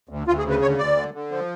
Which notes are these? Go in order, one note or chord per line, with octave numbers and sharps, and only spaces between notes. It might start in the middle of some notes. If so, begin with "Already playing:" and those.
D2
D2 F4
G#4
C#3
B4
D2 C#5
D2 D5
D3
D3
F3